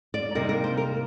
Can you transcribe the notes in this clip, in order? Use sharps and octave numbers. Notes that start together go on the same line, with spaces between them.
D5
C3 G3 A#3 D#4 A#4
A#4
C5
A#4